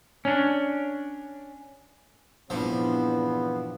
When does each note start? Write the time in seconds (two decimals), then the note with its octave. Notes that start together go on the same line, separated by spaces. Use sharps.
0.25 C#4 D4
2.50 E2 G2 A#2 F3 B3 C4 D4